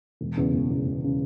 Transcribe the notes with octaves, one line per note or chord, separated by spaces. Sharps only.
E1
E2 C#3
E1
E2 C#3
E1
C#3